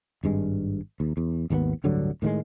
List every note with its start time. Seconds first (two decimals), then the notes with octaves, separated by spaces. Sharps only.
0.23 G#1 G2 G#3
1.00 D#2
1.17 E2
1.50 G#1 D#2 D3 B3
1.84 D1 G2 D3 F#3
2.22 A2 D#3 F#3 G#3